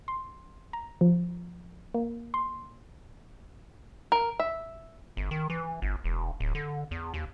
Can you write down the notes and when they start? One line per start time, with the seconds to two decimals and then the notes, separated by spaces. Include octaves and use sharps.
0.08 C6
0.73 A#5
1.01 F3
1.94 A#3
2.34 C6
4.12 A#4
4.40 E5
5.17 G1
5.31 D#3
5.50 E3
5.82 G1
6.04 E1
6.40 D1
6.55 D3
6.91 E2
7.14 D#2